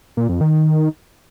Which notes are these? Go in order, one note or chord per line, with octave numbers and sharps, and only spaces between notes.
A#2
F2
D#3